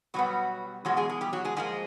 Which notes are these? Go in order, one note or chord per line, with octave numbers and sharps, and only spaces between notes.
B2 F#3 G3 B3 F#4
E2 B2 F#3 G#3 F#4
G#3 G#4
G#3 G#4
G3 G4
F#3 F#4
G#3 G#4
G#2 F3 G#3 A#3 G#4